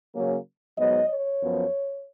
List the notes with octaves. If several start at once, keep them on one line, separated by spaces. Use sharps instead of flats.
C#3 F#3 A#3 C#4
G#2 F#3 B3 D#5
C#5
F#2 F3 B3